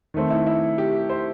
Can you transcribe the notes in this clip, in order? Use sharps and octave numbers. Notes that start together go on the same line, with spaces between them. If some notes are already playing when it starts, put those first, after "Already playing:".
D#3 A3 C4
E4
E4
G4
C5